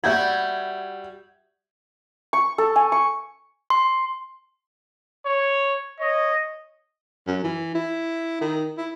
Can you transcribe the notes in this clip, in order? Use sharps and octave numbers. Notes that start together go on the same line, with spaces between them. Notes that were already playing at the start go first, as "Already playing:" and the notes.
G3 F#4 E5 G6 G#6
C#6
A4
G#5
C#6
C6
C#5
C#5 D#5
F#2
E3
E4
D#3
E4